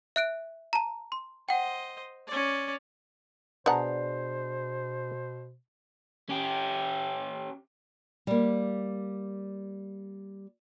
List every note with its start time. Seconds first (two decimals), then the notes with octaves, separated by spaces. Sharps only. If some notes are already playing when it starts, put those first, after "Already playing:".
0.16 E5 F#6 D7
0.73 A5 A#5
1.12 C6
1.49 C5 D#5 F#5 G5
2.27 C#4 D5
3.66 B2 B3 D4 G#4 C5 F#5 A#5
6.29 C#4 G4
8.27 G3 A#3